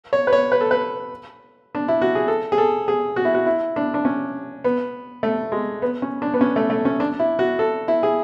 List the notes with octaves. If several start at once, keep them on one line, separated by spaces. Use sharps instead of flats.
C#5
B4
C#5
B4
A4
B4
D4
E4
F#4
G#4
A4
G#4
A4
G#4
F#4
E4
F#4
E4
D4
D4
C#4
B3
A3
G#3
B3
C#4
D4
B3
C#4
A3
A3
C#4
D4
E4
F#4
A4
E4
G#4